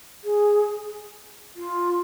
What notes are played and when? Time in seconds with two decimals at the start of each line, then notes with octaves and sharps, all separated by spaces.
0.23 G#4
1.56 F4